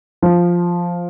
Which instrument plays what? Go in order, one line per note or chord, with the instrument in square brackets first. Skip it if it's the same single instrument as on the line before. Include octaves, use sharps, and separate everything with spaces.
[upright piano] F3